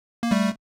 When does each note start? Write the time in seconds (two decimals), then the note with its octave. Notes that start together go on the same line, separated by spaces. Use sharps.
0.23 A#3
0.31 G3 A3